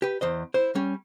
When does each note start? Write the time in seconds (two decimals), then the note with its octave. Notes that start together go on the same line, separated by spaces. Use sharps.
0.02 G4 B4
0.21 E2 C5 D#5
0.54 E4 C5
0.75 G3 C#4